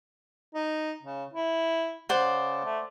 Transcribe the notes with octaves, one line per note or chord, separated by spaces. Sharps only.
D#4
C#3
E4
C#3 C5 D5 F#5
A3